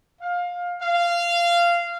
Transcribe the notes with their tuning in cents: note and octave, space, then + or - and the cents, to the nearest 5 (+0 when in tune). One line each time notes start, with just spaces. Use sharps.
F5 +20
F5 -15